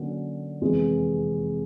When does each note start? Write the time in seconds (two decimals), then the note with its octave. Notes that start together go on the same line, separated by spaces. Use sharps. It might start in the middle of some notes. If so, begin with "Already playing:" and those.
Already playing: D3 F#3 A#3 C#4
0.61 F1 E2 C3 E3 G#3